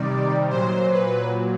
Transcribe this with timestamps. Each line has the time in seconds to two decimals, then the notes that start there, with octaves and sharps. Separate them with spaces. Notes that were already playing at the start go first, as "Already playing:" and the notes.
Already playing: C3 D#3 G3 D5
0.50 A#2 F#3 C5
0.91 B4